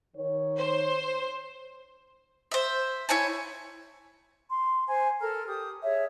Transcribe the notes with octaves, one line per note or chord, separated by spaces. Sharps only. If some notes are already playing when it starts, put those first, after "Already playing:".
D#3 C#5
C5
C5 E5
E4 C#5 G#5 A5
C6
C5 G#5
A4 A#4 A#5 F6
G4 D#6
G#4 C#5 E5